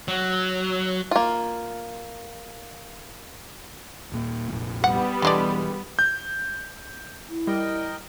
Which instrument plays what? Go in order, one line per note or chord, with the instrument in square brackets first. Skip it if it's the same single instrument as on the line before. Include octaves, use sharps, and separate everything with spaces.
[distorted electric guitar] F#3
[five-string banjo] A#3 F4
[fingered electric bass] D#1 A#2 A#3
F1 A#1 A#2
[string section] G3 B3 [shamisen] F#5
[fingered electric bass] E1 E2 E3 [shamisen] D3 G#3 D5
[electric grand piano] G6
[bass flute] E4
[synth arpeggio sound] G3 [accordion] A#4 D#5 G5